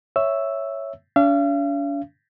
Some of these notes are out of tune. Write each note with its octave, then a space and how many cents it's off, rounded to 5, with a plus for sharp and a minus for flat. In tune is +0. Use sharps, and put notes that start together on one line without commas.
C#5 +0 E5 +0 E6 +0
D4 -45 F5 -40